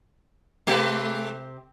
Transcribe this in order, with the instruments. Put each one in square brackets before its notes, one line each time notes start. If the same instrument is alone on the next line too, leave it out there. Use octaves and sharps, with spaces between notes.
[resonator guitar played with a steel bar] C3 C4 G4 [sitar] G#3 A3 B4